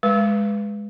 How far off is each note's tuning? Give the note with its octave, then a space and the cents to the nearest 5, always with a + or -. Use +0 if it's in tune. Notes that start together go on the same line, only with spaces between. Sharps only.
G#3 +0 B4 +0